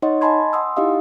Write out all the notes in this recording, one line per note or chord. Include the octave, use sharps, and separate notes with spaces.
D#4 C#5 D#5 F#5 C6
D#5 G#5 A5 B5 C6 G#6
F#5 G#5 C6 D#6 E6
D#4 E4 G4 D#5 F5 D#6